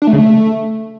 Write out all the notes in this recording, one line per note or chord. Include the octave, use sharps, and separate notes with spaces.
D4
A3
C#3
A3